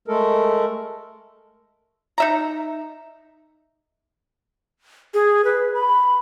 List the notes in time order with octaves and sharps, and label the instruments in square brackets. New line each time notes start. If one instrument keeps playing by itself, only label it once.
[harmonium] G#3 A3 A4 A#4
[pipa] D#4 E5 A#5
[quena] G#4
B4
B5